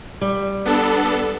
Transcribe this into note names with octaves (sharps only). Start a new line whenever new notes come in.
G3
B3 D4 A4